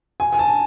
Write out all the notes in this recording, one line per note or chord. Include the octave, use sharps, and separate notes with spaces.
G#5
G#5
A5